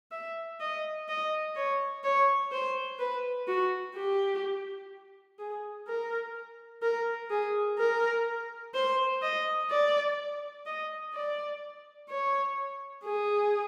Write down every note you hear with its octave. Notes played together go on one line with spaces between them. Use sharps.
E5
D#5
D#5
C#5
C#5
C5
B4
F#4
G4
G#4
A#4
A#4
G#4
A#4
C5
D#5
D5
D#5
D5
C#5
G#4